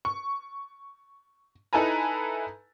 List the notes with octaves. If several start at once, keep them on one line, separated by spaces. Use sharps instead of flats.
C#6
D#4 E4 A4 B4 G#5 A#5